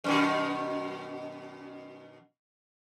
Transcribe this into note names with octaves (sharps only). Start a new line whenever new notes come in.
F#2 B2 D#3